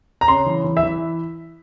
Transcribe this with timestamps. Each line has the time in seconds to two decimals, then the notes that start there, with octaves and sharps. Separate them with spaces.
0.21 A#5
0.28 C#3 C6
0.46 E3
0.64 E3
0.77 E5
0.83 E3